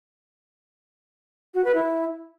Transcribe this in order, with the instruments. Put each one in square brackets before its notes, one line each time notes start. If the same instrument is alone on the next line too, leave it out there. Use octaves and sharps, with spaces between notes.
[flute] F#4
B4
E4